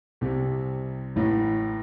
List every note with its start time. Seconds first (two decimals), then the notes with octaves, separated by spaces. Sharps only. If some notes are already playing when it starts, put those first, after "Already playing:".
0.21 C2 C3 G3
1.16 A1 A2 E3